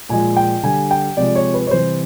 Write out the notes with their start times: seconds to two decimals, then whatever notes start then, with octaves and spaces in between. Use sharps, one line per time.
0.09 A#2 F3 G#3 G#5
0.37 G5
0.63 D3 G3 G#5
0.91 G5
1.17 C3 F3 G#3 D5
1.36 C#5
1.54 B4
1.67 C#5
1.71 C3 E3 G3 C5